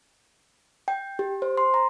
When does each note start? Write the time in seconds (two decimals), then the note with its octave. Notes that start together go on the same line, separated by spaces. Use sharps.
0.88 G5
1.19 G4
1.42 C5
1.57 C6
1.74 A#5